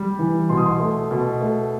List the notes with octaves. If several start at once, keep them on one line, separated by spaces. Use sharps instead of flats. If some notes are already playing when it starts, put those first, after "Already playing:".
Already playing: G3
E3
B2 C6
D#6
C6
A3
B2
A3